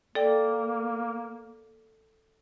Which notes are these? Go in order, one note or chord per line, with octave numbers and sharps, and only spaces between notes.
A#3 A4 D5 G5